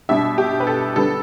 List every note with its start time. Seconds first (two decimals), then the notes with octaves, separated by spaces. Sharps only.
0.09 B2 G3 D4 E5
0.38 G4
0.60 B4
0.67 A4
0.96 D3 G3 B3 A4